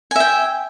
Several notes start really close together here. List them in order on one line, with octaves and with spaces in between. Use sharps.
G#5 E5 G5